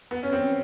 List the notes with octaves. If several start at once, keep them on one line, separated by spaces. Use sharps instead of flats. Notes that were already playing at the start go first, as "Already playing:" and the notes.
B3
C#4
C4